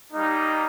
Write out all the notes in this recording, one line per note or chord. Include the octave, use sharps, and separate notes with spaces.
G3 A#3 D#4